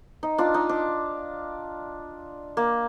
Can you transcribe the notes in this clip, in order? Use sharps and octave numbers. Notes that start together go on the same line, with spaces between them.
D#4
D4 F4
D#4
D4
A#3